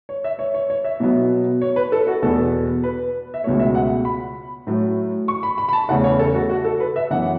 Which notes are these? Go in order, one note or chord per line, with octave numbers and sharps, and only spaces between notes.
C#5
E5
C#5
C#5
C#5
E5
B2 F#3 B3
C#5
B4
A4
F#4
E2 B2 B3 A4
B4
E5
C#2 B2 F#3 A3 C#5
E5
F#5
B5
A2 F#3 A3
C#6
B5
B5
B5
A5
E2 C#3 A3 F#5
C#5
A4
F#4
F#4
A4
B4
E5
F#2 E3 B3 F#5